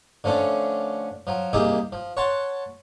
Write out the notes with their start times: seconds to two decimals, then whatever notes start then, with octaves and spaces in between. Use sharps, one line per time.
0.24 D3 F3 A3 C#4 D4
1.27 F3 F#3
1.53 C2 A#3 D#4 G4 G#4 E5
1.92 F3
2.17 C#5 F#5 A5 C6